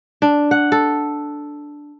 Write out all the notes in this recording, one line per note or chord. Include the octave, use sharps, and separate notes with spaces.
D4
F#5
A4